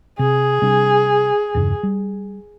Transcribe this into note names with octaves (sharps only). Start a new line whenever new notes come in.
C3 G#4
C3 G3 D4
E2 G2 C#3
G3